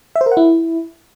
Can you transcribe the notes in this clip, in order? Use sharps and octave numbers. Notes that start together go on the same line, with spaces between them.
E5
C5
A#4
F#5
E4